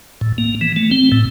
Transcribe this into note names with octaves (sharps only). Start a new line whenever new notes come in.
A2
A#3
E3
A3
C4
A2